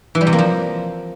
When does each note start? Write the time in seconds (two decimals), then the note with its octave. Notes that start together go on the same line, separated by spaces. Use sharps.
0.15 E3
0.21 G3
0.27 C3
0.33 A#3
0.38 F3